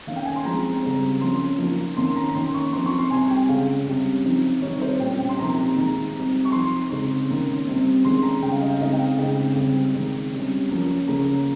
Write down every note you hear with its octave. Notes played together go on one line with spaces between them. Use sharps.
D#3 A#3 C#4 F5
G5
G#5
C6
F3 G#3 C4 D#4 A#5
C#3 G3 C4
F3 A#3 C#4 C6
F3 A#3 D#4
D#3 A#3 C#4 C6
A#5
A#5
D#3 A#3 C#4 C6
C#6
F3 C4 D#4 C6
C#6
C6
C3 G3 C4 G#5
G5
C#3 G#3 C#4 F5
C3 G3 C#4
F3 C4 D#4
D#3 G3 C4 D#4 C#5
C5
A#2 G3 C#4 G5
G5
C6
C3 F3 A#3 D#4 A#5
D#3 G#3 D#4
C3 G3 C4
C#6
F3 C4 D#4 C6
C#3 G#3 C4 D#4
D#3 A#3 C#4
C3 G3 C4
D#3 G#3 C#4 C6
A#5
C#3 G3 C#4 G5
F5
D#5
F5
C#3 G#3 C4 D#4 D#5
G5
F5
C#3 G#3 C4 D#4 G5
C#3 G3 C4
D#3 G#3 D#4
C3 G3 C#4
F3 A#3 C#4
C#3 F3 A#3 C#4 A#5